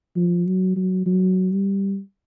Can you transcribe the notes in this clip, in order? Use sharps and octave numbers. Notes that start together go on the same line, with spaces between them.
F3
F#3
F#3
F#3
G3